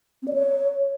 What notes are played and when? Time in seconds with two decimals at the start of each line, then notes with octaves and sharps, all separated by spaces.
0.22 C4
0.28 D5
0.33 C#5